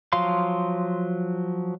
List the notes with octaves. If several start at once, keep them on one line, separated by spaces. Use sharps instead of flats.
F3 F#3 F5 C6